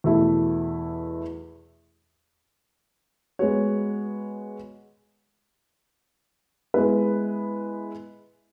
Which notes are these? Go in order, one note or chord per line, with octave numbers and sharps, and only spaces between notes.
E2 B2 A3 E4
G#3 B3 F#4 C#5
G#3 B3 E4 B4